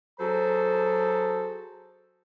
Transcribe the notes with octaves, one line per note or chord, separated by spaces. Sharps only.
F#3 G#4 A4 C5 A#5